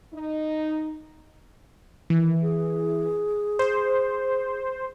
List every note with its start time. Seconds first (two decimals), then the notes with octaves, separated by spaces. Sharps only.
0.13 D#4
2.10 D#3 E3
2.41 G#4
3.59 C5